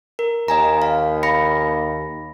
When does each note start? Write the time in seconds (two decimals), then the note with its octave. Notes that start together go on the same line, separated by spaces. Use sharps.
0.19 A#4
0.48 D#2 D#5 G#5 A#5
0.82 F5
1.23 B5 A#6 C#7